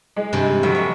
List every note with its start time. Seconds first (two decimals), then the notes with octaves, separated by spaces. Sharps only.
0.16 G#3
0.33 G2 C3 E3
0.63 F1 F#3
0.75 C#5